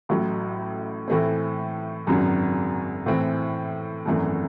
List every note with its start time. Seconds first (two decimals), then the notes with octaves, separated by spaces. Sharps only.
0.09 A1 A2 F#3
1.08 A2 E3 A3 C4
2.07 G#1 F#2 C#3 F#3
3.06 A2 E3 C4
4.06 G#1 F#2 E3 A3